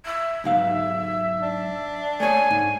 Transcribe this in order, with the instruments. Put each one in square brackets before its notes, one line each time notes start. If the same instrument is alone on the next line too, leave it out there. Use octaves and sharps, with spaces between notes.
[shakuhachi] E5
[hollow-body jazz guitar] B1 G#2 F5
[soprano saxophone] D4
[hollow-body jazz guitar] A3 C#5 [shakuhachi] G#5
[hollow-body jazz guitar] G#2